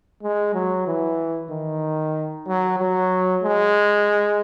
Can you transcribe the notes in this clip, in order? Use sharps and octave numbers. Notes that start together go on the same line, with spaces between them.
G#3
F#3
E3
D#3
F#3
F#3
G#3